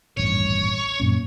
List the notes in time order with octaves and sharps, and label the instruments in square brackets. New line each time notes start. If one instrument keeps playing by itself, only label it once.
[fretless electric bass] D#1 A1 G2 [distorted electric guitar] C#5
[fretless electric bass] F#2 A#2 C#4